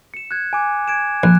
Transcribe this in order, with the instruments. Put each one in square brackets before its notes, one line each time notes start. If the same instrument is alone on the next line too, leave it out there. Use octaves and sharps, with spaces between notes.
[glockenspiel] C#7 E7
F#6 G#6
G#5 D6
G#6 D7 E7
[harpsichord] A#1 [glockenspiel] F#6